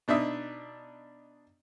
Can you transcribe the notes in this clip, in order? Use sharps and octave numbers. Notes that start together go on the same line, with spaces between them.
B2 D4 D#4 E5 D#6